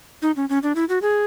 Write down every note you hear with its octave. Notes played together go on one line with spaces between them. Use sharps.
D#4
C#4
C#4
D4
E4
F#4
G#4